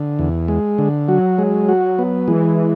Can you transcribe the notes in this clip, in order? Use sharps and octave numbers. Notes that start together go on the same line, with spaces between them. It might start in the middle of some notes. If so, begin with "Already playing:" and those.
Already playing: D3
E2
G#3
D3
F#3 F#4
G#3
F#4
B3
E3 G#3